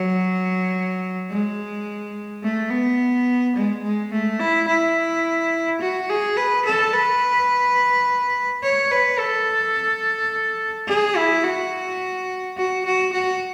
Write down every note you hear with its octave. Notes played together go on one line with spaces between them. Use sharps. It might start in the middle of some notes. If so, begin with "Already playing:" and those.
Already playing: F#3
G#3
A3
B3
G#3
G#3
A3
E4
E4
F#4
G#4
B4
A4
B4
C#5
B4
A4
G#4
E4
F#4
F#4
F#4
F#4